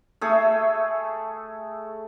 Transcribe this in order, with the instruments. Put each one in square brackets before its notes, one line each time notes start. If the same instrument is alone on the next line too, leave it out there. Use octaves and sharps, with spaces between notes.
[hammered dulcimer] A3 G#4 E5